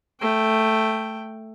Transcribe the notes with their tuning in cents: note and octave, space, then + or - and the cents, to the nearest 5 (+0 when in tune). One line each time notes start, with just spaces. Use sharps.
A3 +0 G5 +0